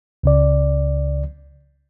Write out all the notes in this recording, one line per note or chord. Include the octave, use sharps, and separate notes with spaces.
C#2 C#3 D5